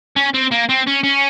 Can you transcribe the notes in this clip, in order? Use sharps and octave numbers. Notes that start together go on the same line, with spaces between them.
C#4
C4
A#3
C4
C#4
C#4